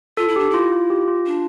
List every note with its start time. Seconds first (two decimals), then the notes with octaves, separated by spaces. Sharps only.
0.17 F4 A4
0.28 E4
0.36 D4 G4
0.50 E4 F4
0.72 F4
0.90 G4
1.08 F4
1.26 D4